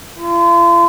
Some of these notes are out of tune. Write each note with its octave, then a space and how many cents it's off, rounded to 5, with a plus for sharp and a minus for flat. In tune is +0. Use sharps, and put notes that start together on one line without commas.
F4 -40